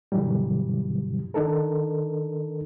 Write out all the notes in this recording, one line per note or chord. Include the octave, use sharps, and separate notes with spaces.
G2 B2 D3 E3 F#3 G3
D#3 D4 D#4 A4 A#4